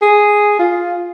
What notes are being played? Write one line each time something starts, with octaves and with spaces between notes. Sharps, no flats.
G#4
F4